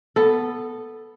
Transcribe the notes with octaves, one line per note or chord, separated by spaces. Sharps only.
B3 A4